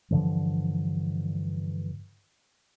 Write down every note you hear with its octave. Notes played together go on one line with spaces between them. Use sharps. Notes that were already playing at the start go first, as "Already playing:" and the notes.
G2 D3 E3 F3